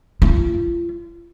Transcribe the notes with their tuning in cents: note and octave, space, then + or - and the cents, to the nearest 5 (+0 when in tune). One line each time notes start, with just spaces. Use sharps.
F4 -35